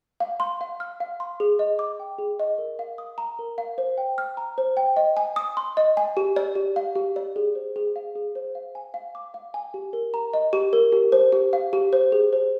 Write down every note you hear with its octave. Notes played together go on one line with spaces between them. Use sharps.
F5
C6
F5
F6
F5
C6
G#4
D#5
D6
G5
G#4
D#5
A#4
F5
D#6
A#5
A#4
F5
C5
G5
F6
A#5
C5
G5
D#5
G#5
D#6
C6
D#5
G#5
G4
D5
G4
F5
G4
D5
G#4
C5
G#4
F5
G#4
C5
F5
G#5
F5
D6
F5
G#5
G4
A#4
A#5
D#5
G4
A#4
G4
C5
G4
F5
G4
C5
G#4
C5